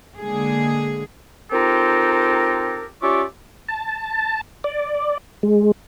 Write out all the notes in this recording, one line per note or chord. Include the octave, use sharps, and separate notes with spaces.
D3 G#3 A#3 G#4
C4 D#4 F4 G4 A4 A#4
C#4 F4 G4 D5 E5 C#6
A5
D5
G#3